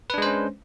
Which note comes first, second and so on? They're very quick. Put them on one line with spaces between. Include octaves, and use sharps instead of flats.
B4 D4 G#3 C5 C#4